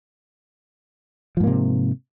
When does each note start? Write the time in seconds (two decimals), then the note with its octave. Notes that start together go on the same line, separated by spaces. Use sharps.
1.37 F3
1.40 G#2
1.44 A#3
1.47 C3